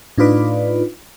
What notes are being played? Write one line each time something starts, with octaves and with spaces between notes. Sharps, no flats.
A2 D4 D#4 F4 B4 D5